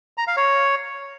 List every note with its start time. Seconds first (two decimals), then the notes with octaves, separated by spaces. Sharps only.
0.18 A#5
0.27 F5
0.37 C#5